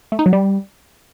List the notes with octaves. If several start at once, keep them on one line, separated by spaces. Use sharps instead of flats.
A3
D#4
F#3
G3